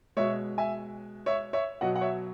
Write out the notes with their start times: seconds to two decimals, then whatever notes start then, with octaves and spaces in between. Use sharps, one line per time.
0.17 B2 G#3 C#5 E5
0.58 E5 G#5
1.26 C#5 E5
1.53 C#5 E5
1.81 B2 F#3 D#5 F#5
1.96 F#5
2.01 C#5 E5